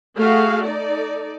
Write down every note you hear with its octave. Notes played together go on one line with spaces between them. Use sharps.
A3 F#4 G#4 F5
D#4 A4 D5